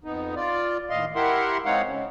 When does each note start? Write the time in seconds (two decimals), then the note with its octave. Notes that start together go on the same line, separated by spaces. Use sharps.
0.04 F2 B3 D#4
0.36 F4 D5
0.90 D#2 A2 D#5 F5 C6
1.16 E4 G4 A#4 E5 F#5 C6
1.65 G#3 C4 D#4 C#5 F5 F#5
1.86 C#3